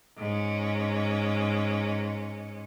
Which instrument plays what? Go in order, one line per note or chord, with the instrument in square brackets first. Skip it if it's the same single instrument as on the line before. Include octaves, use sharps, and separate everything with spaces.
[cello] G#2 C#4